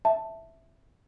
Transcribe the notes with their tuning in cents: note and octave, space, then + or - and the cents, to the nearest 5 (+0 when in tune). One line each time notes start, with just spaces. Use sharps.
E5 +0 A5 +5